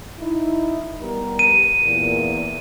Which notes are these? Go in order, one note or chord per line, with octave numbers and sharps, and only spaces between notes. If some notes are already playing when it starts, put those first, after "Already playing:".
D#4 E4
G3 B3 A#4
D#7
E2 A#2